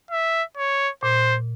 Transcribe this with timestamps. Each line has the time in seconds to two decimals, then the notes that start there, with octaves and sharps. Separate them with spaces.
0.11 E5
0.57 C#5
1.03 A#2 C5